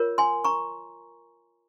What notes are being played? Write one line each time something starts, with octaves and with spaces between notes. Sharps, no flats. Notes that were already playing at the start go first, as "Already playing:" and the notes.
Already playing: F4 A#4 C#5
G#5 C6
A#5 C#6